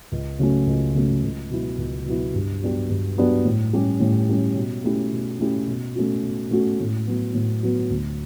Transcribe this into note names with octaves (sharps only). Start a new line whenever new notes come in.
C#2
C#3 F#3 A3 C#4
C#2
C#3 F#3 A3 C#4
C#2
B2 F#3 B3 E4
C#2
B2 F#3 B3 E4
G2
F#3 B3 D4 G4
G2
F#3 B3 D4 G4
A2
G3 C#4 G4
A2
G3 C#4 G4
B2
A3 C#4 E4 G4
B2
A3 C#4 E4 G4
B2
A3 C#4 F#4
B2
A3 C#4 F#4
A2
F#3 B3
A2
F#3 B3
D2